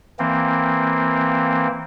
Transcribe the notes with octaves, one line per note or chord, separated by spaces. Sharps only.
E3 A#3 C4